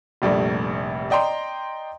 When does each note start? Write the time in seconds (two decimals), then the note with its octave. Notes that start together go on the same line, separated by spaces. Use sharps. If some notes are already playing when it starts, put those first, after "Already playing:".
0.22 F1 A#1 G3 A3
1.10 D5 D#5 G5 A#5 C6